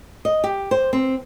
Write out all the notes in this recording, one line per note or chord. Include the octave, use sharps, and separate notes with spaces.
D#5
G4
C5
C4